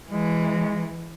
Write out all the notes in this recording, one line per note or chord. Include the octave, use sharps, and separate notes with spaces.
E3 G#3